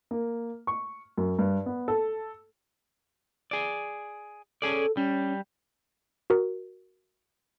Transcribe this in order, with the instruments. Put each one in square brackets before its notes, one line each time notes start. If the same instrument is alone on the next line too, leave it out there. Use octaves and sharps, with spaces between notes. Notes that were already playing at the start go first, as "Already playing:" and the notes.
[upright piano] A#3
C#6
F#2
G2
B3
A4
[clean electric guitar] G#4 D5
[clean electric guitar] C#4 G#4 D5 [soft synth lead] A4
[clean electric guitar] G3 [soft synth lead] C#4
[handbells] F#4 A#4